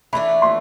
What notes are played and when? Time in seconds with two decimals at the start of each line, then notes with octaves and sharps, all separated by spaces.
0.13 E3 A3 D4 B5
0.42 C6